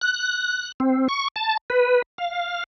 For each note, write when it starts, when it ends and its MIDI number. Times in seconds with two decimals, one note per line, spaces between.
0.01 0.72 90
0.80 1.08 60
1.09 1.28 85
1.36 1.57 81
1.70 2.02 71
2.18 2.64 77